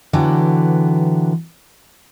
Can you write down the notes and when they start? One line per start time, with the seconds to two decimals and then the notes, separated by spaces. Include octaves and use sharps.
0.13 D3 E3 F#3 B3 G5